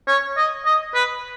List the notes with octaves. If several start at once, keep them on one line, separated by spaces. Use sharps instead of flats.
C#5
D#5
D#5
B4